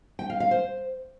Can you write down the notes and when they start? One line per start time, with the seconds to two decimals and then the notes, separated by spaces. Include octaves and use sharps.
0.19 G5
0.30 F5
0.40 F5
0.51 C5